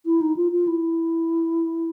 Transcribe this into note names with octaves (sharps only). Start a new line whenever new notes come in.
E4
D#4
F4
F4
E4